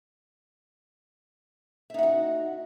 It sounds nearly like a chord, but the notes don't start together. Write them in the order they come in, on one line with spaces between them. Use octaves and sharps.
E5 D#4 F#5 F#4